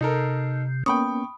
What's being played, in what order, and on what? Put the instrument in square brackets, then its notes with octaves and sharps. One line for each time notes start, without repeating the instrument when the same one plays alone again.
[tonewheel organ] C3 [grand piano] D#4 A4 A#4
[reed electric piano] A#3 B3 C#4 [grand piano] G5 C#6 [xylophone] B5 D#6